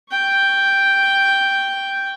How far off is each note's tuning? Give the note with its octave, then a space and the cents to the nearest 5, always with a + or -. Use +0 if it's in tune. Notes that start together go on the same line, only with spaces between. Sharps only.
G5 +0 C#6 +0